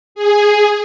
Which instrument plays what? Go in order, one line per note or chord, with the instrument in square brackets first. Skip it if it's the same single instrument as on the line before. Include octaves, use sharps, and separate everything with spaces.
[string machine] G#4